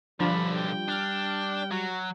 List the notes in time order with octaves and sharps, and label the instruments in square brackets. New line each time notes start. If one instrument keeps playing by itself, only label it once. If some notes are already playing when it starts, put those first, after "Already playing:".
[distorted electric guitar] B1 D3 [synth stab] F3 D4 F4 [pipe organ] G3 [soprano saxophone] B5
[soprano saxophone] G5
[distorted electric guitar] D4 [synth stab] F6
[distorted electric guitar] F#3 [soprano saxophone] F#4